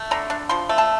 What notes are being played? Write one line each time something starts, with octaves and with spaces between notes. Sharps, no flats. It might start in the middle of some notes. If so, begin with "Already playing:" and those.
Already playing: A3
D3 A#5
D4
F3 C6
A3
A5